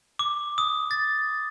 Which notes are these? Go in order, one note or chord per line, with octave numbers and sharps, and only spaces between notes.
D6
D#6
A6